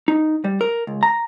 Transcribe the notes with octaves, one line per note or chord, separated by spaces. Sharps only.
D#4
G3
A#4
C#2
A#5